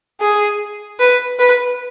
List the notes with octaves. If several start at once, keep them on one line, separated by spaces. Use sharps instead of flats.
G#4
B4
B4